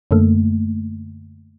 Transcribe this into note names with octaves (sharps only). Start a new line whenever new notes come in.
F#2 D3 A3 A#3